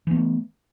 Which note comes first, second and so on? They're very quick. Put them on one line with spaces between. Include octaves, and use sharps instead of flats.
E3 B3 A3